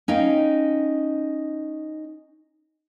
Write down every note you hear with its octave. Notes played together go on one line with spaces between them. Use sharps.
C#4 D#4 F5 G5